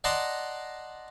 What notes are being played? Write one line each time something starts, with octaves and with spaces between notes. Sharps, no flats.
D5 D#5 F#5 A5 A#5 C6